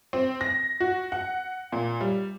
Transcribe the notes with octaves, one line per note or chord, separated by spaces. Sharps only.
C4
A#6
F#4
F#5
A#2
G3